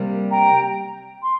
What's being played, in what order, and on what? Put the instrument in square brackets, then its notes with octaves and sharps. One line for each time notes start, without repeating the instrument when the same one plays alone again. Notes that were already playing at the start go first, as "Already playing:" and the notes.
Already playing: [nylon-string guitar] C3 G3 A#3
[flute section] G5 A#5
C6